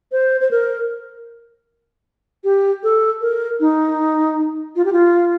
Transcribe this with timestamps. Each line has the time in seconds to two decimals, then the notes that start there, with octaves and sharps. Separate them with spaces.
0.12 C5
0.41 C5
0.51 A#4
2.44 G4
2.83 A4
3.21 A#4
3.60 D#4
4.76 F4
4.85 G4
4.92 F4